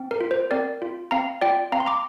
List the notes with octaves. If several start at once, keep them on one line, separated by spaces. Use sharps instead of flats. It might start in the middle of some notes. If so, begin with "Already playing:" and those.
Already playing: C4
A#4
F4
C5
C4 A#4 D5
F4
C4 F5 A#5
F4 D5 G5
C4 F5 A#5
C6
A#5 D6